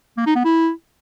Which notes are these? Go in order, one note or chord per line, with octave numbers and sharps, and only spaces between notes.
A#3
D#4
B3
E4